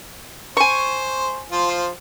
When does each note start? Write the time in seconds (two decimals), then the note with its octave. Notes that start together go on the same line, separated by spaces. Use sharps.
0.57 C5 G#5 C#6
1.52 F3 F4 C5